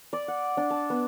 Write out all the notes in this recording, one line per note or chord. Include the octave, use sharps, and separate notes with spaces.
D5
F#5
D4
A5
B3